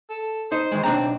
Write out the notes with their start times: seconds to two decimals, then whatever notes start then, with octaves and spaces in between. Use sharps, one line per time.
0.10 A4
0.52 D#4 C5
0.72 D#3 G#3
0.83 B1 C4 D4 A#5